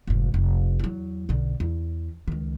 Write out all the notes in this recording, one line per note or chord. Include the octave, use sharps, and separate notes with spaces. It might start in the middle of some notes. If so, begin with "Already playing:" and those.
F1 G#2
F1
E2 F#3
B1 D3
E2
C#2 D#3